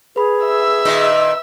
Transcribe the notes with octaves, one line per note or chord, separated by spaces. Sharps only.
G#4 B4 B5
E5 E6
A#2 D#3 D#5